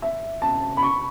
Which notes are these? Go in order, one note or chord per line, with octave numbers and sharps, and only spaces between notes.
E5
A5
B5
C#6